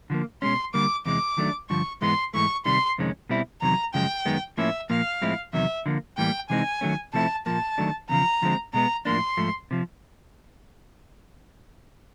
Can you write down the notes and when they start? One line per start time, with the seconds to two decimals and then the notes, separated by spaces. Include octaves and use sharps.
0.10 D3 F3 A#3
0.42 B2 G#3 C#4 C6
0.74 D3 G3 A#3 D6
1.06 E2 C3 E3 G#3 D6
1.38 D#3 F#3 A3 D4
1.70 G2 D3 F3 C#6
2.02 G#2 E3 G#3 B3 C6
2.34 G#2 E3 A3 C#6
2.66 C3 D#3 G3 C6
2.98 F2 C3 D#3 G#3 C#4
3.29 B2 G3 C4 E4
3.62 E2 C3 D#3 F#3 A#5
3.94 F#2 C#3 F3 G#3 G5
4.26 F#2 D#3 G#3 B3
4.58 A2 F3 A#3 C#4 E4 E5
4.90 A#2 F3 A#3 F5
5.22 A2 F3 G#3 C4 E4
5.53 E2 C3 D#3 F#3 E5
5.86 D3 F3 A#3
6.17 A2 E3 G3 A#3 G5
6.50 C3 E3 G#3 C4 D#4 G#5
6.81 D#3 F#3 A3 C#4
7.13 C3 F3 A3 C4 E4 A5
7.46 A#2 F3 A#3 A5
7.78 D#3 F#3 A3 D4
8.09 E2 C#3 F3 A#5
8.42 D3 F3 G#3 C4
8.74 B2 G#3 B3 A#5
9.05 A2 F3 A#3 D4 C6
9.37 G#2 F3 A3
9.71 C3 F3